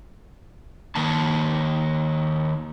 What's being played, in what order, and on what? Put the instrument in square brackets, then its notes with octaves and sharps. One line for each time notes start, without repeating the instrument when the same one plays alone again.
[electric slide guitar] D#3 A#3 A5